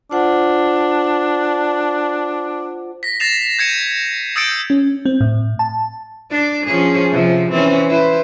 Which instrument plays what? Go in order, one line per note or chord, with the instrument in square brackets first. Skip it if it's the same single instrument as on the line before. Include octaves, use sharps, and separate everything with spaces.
[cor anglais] D4 [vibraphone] F4 C5 F#5
[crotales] A#6 B6
A6 A#6 C7 E7 F7
G6 G#6 C#7 D#7 E7
D#6 E6 G6 A6 C#7 D7
[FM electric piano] C#4
C4
A2
A5
[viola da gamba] D4 D5
F3 C#4 G#4
C3 F3
E3 C4 C#4
E4 B4 C5